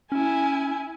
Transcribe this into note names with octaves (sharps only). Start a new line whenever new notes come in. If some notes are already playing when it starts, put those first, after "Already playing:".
C#4 E4 G#5